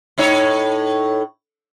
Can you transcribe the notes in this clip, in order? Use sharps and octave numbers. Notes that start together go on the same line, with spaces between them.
A2 D#4 C#5